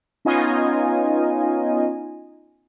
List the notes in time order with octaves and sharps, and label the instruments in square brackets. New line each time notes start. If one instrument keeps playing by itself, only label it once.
[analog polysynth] B3 C#4 D#4 F4 D#5 G#5